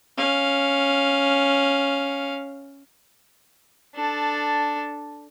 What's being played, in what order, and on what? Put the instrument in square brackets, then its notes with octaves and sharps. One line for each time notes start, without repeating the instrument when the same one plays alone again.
[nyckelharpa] C#4 F5
[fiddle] D4 A4